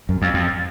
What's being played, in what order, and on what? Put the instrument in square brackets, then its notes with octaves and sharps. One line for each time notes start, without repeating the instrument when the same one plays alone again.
[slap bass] F#2
F2
F2